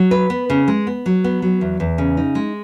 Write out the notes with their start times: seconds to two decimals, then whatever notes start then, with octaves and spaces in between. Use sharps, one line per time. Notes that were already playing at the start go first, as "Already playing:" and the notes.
Already playing: F#3
0.11 B4
0.30 B3
0.50 C#3
0.68 G#3
0.87 B3
1.06 F#3
1.24 B3
1.42 F#3
1.61 E2
1.80 E2
1.98 C#3
2.17 D#4
2.35 G#3